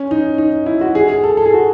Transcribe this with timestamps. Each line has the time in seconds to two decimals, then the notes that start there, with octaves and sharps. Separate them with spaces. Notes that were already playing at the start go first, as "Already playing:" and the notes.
Already playing: C#4
0.11 D#4
0.38 D#4
0.66 E4
0.81 F#4
0.95 G#4
1.09 G#4
1.24 A4
1.37 A4
1.46 G#4
1.54 F#4